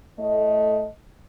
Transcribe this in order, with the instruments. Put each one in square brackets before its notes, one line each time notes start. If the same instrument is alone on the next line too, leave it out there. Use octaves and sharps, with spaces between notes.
[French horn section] A2 A3 D#5